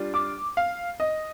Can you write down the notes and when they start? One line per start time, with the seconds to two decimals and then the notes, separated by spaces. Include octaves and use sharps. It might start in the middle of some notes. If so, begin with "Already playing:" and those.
Already playing: G3 D4 F4
0.14 D6
0.57 F5
1.00 D#5